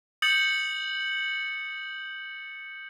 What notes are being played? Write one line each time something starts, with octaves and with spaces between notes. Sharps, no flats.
D#6 G6 A6 C#7 F#7